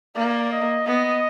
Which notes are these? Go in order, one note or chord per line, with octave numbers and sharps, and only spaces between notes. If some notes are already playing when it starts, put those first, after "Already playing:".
A#3 D5
D#5
B3 D#5